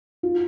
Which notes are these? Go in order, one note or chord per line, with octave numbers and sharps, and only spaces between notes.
F4